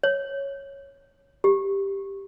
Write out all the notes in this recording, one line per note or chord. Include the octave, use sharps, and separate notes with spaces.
C#5
G4